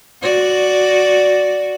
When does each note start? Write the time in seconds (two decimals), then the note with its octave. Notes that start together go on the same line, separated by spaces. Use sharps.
0.22 F#4 D5